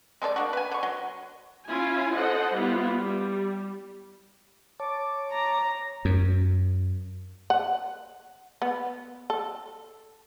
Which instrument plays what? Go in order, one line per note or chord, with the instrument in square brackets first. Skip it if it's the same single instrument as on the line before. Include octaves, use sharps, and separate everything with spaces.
[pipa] G#3 A4 B4 D5
A#3 D4 F#4
B4 G#5
D3 C#6
F#3
[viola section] C#4 E4 F4 G#5
A4 C5 D#5 F#5
G3 B3 E4 F4
G3
[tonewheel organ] C#5 A5 D6
[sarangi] A#5
[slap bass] F#2
[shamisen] F#5
B3
A4